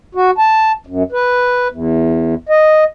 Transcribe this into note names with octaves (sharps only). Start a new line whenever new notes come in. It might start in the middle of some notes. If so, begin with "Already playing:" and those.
F#4
A5
F#2
B4
E2
D#5